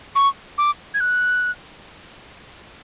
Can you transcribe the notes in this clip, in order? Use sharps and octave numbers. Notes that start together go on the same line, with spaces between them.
C#6
D6
G#6
F#6